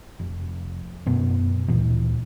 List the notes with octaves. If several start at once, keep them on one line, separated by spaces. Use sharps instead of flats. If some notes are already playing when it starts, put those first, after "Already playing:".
F1
F#2 B2 B3
D2 A#2 E3